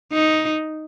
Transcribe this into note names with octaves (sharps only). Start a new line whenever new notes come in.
D#4